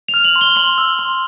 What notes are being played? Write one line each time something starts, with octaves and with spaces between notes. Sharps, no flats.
F7
F6
F#7
C6
G7
C6 F#7
E6
C6